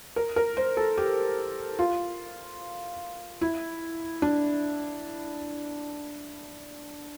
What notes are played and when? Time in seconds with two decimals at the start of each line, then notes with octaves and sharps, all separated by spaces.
0.16 A#4
0.36 A#4
0.57 C5
0.77 A4
0.98 G4
1.79 F4
3.41 E4
4.22 D4